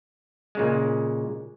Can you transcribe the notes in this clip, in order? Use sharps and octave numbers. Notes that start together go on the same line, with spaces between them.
A#2 C#3 G#3